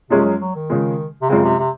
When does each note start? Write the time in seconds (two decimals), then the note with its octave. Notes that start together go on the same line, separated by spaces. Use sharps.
0.10 F#2 C3 F3 G#3 C#4 G#4
0.25 F#3
0.40 F#3
0.55 D#3
0.70 C#3 F3 G#3
1.22 C3
1.29 F#2 C#3 F3 G#3 C4
1.44 C3
1.59 C3